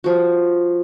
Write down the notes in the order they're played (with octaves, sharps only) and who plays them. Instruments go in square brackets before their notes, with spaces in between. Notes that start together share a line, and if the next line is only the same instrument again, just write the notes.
[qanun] F3 F#4